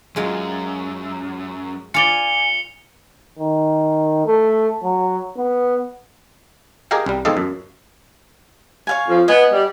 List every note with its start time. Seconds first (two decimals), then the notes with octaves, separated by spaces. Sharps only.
0.16 F#2 G#3 F4
1.94 F4 D5 G#5 C#7 F7 G7
3.39 D#3
4.26 A3
4.84 F#3
5.37 B3
6.91 G4 G#4 A#4 D#5 F5 G5
7.06 C2 G3
7.25 E2 G#2 C4 A4 D#5 F5
7.37 F#2
8.87 C#5 F5 G#5
9.08 F2 F3
9.28 B3 D#5 G#5
9.52 G3